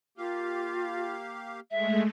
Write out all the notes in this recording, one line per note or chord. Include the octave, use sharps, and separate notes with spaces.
A#3 F4 G4 F5
G#3 A3 E5